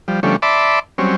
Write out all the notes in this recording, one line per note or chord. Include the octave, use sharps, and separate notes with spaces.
F3 G3
D3 F3 G3 A3 C#4
D5 E5 A5 B5 C6 D6
F#3 G3 C4 C#4